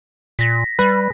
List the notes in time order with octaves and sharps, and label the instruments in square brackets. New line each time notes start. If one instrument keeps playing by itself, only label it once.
[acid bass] A#2 [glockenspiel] A#6 B6
[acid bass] G3 [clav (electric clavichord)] B4